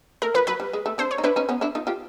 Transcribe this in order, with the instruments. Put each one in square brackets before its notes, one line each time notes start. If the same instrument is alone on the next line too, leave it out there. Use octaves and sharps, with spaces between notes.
[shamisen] A3 [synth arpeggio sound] A#4
[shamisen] F3 [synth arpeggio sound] B4
[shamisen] F#3 [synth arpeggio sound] B4
[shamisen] G3
G#3
A3
[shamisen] C4 D4 [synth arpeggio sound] C5
[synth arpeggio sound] C#5
[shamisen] D#4
[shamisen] D4 E4 [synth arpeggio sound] B4
[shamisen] C#4 D#4
B3 C#4
D4 E4
D#4 F4
F4 G4